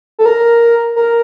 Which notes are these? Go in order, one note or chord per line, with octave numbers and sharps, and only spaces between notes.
A4
A#4
A#4